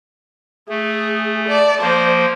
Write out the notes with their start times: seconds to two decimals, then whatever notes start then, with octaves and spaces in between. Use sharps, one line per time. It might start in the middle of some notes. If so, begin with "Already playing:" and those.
0.69 A3 G#4
1.48 D5 A5
1.82 F3 A#3 C5